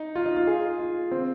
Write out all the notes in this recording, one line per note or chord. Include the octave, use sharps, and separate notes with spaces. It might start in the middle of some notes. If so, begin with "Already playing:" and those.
Already playing: D#4
F4
D#4
F4
G#4
F4
C4